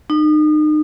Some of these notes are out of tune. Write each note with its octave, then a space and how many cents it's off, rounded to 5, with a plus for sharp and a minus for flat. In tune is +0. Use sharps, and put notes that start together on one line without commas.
D#4 -35